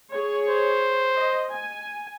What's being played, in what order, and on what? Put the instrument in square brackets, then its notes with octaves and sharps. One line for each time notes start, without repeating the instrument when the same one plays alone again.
[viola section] G#4 C#5
[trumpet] C5
[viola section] D#5
G#5